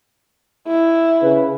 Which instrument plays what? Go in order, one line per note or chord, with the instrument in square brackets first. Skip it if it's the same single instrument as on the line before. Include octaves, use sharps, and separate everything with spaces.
[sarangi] E4
[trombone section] C#3 B4